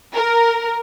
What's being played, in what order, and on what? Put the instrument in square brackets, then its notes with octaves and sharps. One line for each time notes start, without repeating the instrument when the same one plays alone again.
[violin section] A#4